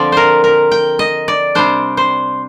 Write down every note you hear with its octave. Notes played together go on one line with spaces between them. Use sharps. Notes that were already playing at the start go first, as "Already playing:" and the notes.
Already playing: D3 F3 C4 D5
A#4 C5
A#4
G5
D#5
D5
C3 G3 D4 C5
C5